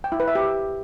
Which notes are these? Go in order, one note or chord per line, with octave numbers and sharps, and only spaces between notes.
G5
E4
B4
E5
G4